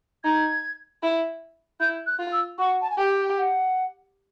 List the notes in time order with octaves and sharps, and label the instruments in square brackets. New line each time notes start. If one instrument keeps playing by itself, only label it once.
[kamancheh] D#4 [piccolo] G#6
[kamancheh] E4
[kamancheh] E4 [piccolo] G6
[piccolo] F#6
[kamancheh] F4
[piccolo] E6
[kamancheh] F#4 [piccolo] C#6
[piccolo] A5
G#5
[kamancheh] G4 [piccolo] G5
[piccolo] F#5